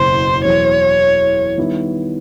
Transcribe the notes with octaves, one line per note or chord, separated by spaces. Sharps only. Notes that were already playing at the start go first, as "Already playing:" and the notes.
Already playing: F#1 E2 B2 C5
E2 B2 F#3 C#5
D#3 G3 B3 E4